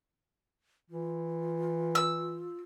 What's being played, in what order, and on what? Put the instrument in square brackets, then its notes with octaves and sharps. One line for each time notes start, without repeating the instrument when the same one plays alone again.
[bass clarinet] E3 [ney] F4
[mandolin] E6